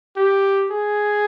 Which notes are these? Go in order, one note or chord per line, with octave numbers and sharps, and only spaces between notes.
G4
G#4